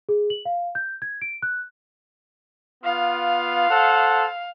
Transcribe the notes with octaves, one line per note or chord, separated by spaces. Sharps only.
G#4
F#7
F5
G6
G#6
D7
F#6
B3 F4 F5
A4 C5 F#5